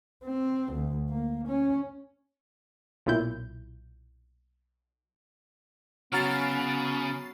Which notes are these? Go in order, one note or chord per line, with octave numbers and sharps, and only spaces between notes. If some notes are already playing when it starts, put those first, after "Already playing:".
C4
D2
A#3
C#4
B1 A#2 E4 G6
C#3 F#3 B3 F6 A6 C7